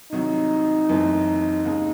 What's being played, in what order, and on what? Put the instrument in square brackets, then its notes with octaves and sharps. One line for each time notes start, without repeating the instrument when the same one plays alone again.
[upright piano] C2 C3 D#3 F#3 [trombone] D#4
[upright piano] F#1 F#2 E3 A3 C4
D#2 C#3 G#3